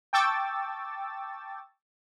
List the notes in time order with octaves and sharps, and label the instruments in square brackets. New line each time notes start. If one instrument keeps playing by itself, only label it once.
[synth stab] G5 A5 C#6 D6 E6 A6